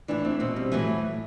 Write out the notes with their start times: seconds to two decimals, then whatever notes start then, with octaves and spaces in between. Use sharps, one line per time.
0.08 A2 E3 D4
0.25 C4
0.40 B2 C4
0.56 G3
0.72 A2 E3 F#3